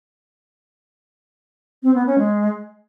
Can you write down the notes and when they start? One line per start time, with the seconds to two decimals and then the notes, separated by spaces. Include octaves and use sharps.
1.83 C4
1.95 B3
2.07 C#4
2.18 G#3